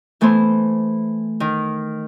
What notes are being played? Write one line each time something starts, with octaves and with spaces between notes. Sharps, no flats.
E3 A3 B3 E4 C5
D#3